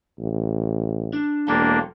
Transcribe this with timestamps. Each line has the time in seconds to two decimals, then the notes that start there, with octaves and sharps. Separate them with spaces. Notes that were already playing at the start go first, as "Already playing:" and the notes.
0.19 A1
1.13 D4
1.48 E1 F#3 A#3 D4 A4 G5